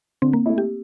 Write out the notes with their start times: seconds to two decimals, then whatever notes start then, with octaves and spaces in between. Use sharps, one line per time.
0.22 D3 C4
0.33 A#3
0.46 A3 E4
0.58 G4